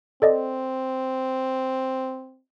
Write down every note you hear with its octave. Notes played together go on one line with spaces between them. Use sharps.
C4 A4 D5 D#5